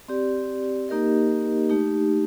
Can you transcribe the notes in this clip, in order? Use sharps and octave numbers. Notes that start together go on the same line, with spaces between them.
C4 G4 D5
A#3 D#4 G4 A#4 D#5
A3 D#4 G4